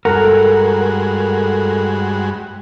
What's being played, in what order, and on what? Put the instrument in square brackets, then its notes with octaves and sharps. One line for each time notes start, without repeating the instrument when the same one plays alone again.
[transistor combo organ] G2 G#3 F#4 [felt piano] A4 [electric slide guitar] A#4 [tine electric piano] F#5 A#5